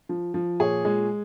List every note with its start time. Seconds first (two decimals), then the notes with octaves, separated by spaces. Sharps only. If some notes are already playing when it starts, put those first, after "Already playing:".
0.09 F3
0.34 F3
0.60 A#2 G#4 C#5
0.85 G#3